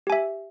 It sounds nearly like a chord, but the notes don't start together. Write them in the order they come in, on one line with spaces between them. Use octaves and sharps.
G4 G#5 E5